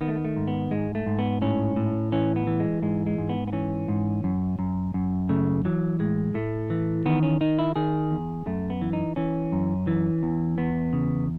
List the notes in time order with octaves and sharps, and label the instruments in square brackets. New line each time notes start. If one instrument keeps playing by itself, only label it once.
[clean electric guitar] D#3 B3
A3
B3
A3
G#2
B3
G#2 G#3
A3
G#2
B3
A2 C#4
A2
E3 C#4
B3
E3
G#3
G#2 G#3
G#3
G#2
B3
B3
E3 C#4
G#2
F#2
F#2
F#2
C#3 A3
E3 F#3
A2 G#3
A2 A3
E3
D#3 B3
C#4
D#3 D#4
E4
D#3 G#4
E2
F#2 A3
B3
E3
D#4
E3 C#4
F#2
E3
E2
E2 B3
C#3